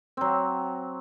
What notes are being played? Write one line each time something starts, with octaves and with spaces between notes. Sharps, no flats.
F#3 C4